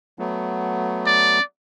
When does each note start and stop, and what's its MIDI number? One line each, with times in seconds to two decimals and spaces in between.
0.19 1.39 54
0.19 1.39 57
0.19 1.39 59
1.06 1.42 74